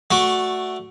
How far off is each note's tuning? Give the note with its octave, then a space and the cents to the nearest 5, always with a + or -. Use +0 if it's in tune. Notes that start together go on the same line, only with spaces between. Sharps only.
A3 +0 F#4 +0 D5 +0